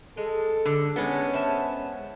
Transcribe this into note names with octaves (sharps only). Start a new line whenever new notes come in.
G#3 A4
D3
G#3 B3 C#4 D4 A4
C5 E5 A5